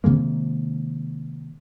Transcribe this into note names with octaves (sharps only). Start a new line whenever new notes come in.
C3 D#3 G#3 A#3